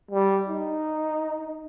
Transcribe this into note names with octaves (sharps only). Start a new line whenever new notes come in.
G3
D#4